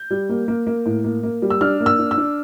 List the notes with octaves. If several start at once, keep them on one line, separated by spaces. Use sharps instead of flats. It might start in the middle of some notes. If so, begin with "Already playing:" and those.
Already playing: G6
G3
A#3
A#3
A#3
A2
A#3
A#3
G3
E6
D4 F6
A#3
E6
D4
E6
D4